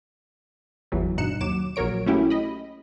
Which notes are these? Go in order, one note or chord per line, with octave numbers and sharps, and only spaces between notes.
G1 E2 E3 F#3
G2 B2 D#4 F#6 C#7 E7
D#2 F#3 D6 E7
A#1 F#3 A#4 C#5 D7
A3 A#3 C#4 E4 F#4 G4
D#5 B5